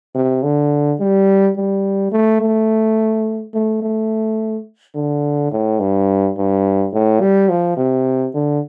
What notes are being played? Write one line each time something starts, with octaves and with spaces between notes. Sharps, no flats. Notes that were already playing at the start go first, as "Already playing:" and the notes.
C3
D3
G3
G3
A3
A3
A3
A3
D3
A2
G2
G2
A2
G3
F3
C3
D3